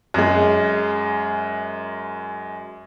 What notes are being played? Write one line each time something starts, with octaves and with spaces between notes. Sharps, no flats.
F#2 G#3